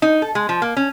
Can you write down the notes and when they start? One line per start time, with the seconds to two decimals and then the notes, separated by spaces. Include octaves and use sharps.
0.02 D#4
0.22 A4
0.35 G#3
0.49 F3
0.62 A#3
0.77 C#4